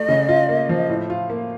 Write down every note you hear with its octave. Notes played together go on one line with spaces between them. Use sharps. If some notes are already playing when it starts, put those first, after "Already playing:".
Already playing: A3 D#5
C#3
F4
A#3
F3
A2
F4
A#3